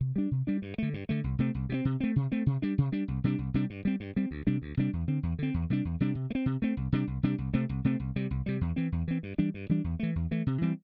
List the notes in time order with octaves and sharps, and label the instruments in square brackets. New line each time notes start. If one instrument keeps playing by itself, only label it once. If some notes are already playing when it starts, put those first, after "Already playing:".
[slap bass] C3
G3 D4
C3
G3 D4
G2
D3 A3
G2
D3 A3
C2
C3 A3 C4
C2
C3 A3 C4
C3
A3 C4
C3
A3 C4
C3
G3 D4
C3
G3 D4
C2
C3 G3 D4
C2
C3 G3 D4
G2
G3 C4
G2
G3 C4
D2
C3 G3 D4
D2
C3 G3 D4
E2
D3 C4
E2
D3 C4
E2
C3 G3 D4
E2
C3 G3 D4
C3
A3
C4
C3
A3 C4
C2
C3 G3 D4
C2
C3 G3 D4
C2
C3 A3 C4
C2
C3 A3 C4
C2
C3 G3
C2
C3 G3
E2
E3 C4
E2
E3 C4
G2
E3 G3 D4
G2
E3 G3 D4
E2
E3 A3
E2
E3 A3
C3
E3 G3 C4